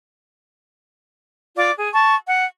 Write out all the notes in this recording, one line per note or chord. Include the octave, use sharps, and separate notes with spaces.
F4 D5 D6
G#4
A5 C#6
F#5